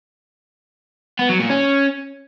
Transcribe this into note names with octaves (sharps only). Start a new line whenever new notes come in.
B3
F#3
A#2
C#4